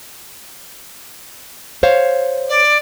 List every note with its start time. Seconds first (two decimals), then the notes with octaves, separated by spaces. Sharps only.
1.83 C5 C#5 F5
2.48 D5